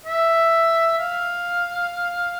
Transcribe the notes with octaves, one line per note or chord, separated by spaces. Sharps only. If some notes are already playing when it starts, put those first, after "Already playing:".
E5
F5